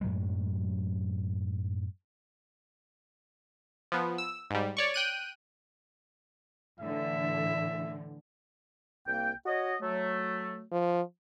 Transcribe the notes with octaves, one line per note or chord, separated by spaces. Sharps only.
F#2 A2 F#3 G#3
F3 B3
E6
G#2 G3
C#5 D5 C#6
G5 F#6 D#7
A2 D3 E3 E5
C2 A#3 G5
F#4 C#5 D#5
F#3 A3
F3